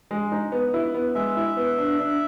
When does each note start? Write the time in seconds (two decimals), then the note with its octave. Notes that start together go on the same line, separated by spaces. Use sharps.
0.11 G#3
0.32 D#4
0.52 B3
0.74 E4
0.94 B3
1.15 G#3 E5
1.37 E4
1.57 B3
1.78 D4
1.99 D4